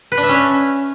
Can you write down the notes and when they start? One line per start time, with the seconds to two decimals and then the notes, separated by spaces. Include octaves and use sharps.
0.12 B4
0.17 D4
0.23 E5
0.29 C#4